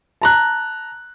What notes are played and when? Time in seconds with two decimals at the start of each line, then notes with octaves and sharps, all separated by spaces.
0.22 A5 A#5 F#6